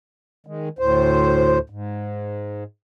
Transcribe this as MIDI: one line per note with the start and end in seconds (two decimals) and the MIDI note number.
0.47 0.69 51
0.47 0.69 56
0.79 1.59 38
0.79 1.59 45
0.79 1.59 72
1.70 2.64 44